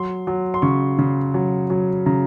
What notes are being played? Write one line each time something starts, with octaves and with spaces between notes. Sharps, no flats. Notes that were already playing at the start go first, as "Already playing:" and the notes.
Already playing: F#3 C6
F#3
C6
C#3 C#6
C#3
F#3
F#3
C#3 A#5